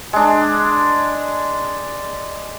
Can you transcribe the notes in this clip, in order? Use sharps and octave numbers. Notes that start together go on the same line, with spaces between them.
G#3 D4